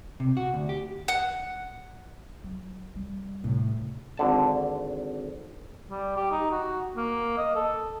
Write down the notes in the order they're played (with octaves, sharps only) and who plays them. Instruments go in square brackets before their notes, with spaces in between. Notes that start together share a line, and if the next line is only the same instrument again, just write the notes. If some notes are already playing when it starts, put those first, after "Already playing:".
[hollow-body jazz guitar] C3
F#4
D2
G4
[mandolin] F#5
[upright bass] F#3
G3
A2 C3
[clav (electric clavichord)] G#1 D3 A5
[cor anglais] G3
G4
D#4
F#4
A#3
D#5
A4